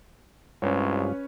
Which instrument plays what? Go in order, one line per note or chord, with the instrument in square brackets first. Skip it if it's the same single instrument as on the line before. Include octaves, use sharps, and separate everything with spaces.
[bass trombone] C2 [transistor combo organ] G2 G#3 F4 [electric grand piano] C#4 B4 C#5